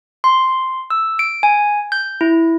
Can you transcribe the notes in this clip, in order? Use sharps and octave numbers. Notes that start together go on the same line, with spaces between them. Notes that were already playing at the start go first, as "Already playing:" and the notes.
C6
E6
D7
G#5
G6
E4